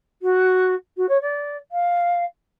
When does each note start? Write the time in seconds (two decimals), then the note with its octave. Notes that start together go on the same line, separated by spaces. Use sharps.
0.22 F#4
0.97 F#4
1.09 C#5
1.22 D5
1.72 F5